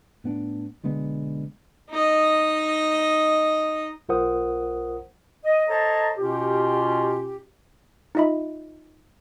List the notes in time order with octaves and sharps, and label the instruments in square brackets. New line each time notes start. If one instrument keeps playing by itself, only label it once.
[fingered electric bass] A2 B3 D4
B1 D3 G#3 B3
[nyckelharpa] D#4 D#5
[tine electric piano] B1 F4 A#4 C5 F#5 D#6
[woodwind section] D#5
A4 C5 C#5 D#5 A5 A#5
B2 C#4 F4 G4
[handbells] D#4 F4 D#5 E5 B5